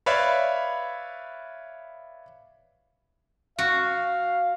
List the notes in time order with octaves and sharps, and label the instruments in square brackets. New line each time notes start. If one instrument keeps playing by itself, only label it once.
[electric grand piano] B4 C#5 D5 E5 F5 B5
[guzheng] F#4 [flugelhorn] F5